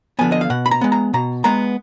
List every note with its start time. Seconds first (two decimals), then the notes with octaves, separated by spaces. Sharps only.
0.19 D3 F3 B3 G#5
0.32 D#5
0.41 F5
0.50 B2 F#5
0.66 B5
0.71 A#5
0.81 G#3 B3
0.92 A#5
1.14 B2 A#5
1.44 G#3 B3 A#5